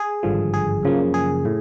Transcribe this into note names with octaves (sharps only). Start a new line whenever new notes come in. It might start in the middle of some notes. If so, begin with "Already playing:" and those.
Already playing: G#4
G#1 G2 D3 F3
G#4
F#2 C#3 F3 A#3
G#4
A2